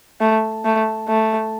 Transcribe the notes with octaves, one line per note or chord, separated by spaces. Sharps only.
A3
A3
A3